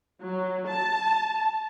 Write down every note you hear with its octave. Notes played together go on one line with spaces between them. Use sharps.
F#3
A5